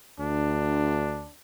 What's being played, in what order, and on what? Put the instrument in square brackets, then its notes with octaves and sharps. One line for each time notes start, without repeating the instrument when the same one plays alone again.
[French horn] D2 [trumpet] D4